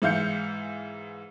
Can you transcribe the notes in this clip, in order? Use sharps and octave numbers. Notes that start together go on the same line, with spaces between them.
G#2 E3 F5 G6 C#7